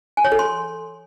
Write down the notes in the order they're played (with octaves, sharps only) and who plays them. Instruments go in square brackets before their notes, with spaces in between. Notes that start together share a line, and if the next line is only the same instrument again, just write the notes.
[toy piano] G#5
C#5
A4
C6